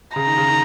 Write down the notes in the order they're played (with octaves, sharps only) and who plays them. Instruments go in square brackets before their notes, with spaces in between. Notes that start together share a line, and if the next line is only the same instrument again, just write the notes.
[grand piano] C#3 [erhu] A#5
[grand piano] D#3
C#3
D#3